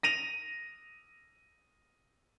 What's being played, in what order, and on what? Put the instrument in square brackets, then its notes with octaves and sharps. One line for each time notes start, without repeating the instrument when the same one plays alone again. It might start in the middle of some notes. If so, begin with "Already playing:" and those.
[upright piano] A#6 D#7 F7